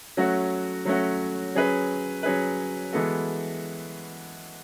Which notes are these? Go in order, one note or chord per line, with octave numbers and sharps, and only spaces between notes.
F#3 A3 C#4 F#4
F#3 A3 C#4 F#4
F#3 C#4 G#4 B4
F#3 C#4 G#4 B4
E3 G#3 B3 F#4 A4